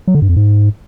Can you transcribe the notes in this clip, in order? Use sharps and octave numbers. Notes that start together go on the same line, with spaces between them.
F#3
D3
G2
F2
G#2